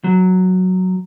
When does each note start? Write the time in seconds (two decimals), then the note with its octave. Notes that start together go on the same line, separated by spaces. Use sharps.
0.04 F#3